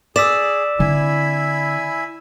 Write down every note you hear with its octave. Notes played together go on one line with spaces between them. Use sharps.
G#4 D5 E6 B6 E7
D3 C4 E4 G#5 B5